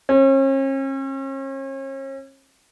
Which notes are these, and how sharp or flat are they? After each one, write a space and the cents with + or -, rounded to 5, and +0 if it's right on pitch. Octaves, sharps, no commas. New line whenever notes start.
C#4 -40